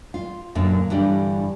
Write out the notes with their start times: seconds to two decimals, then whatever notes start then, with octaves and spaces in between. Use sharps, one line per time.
0.14 F4
0.55 F#2 A#2 D3
0.90 G2 D3 E3 G3